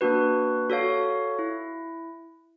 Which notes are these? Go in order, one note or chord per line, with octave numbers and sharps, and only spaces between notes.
A#3 D4 F#4 B4
F#4 A4 C#5 F5
E4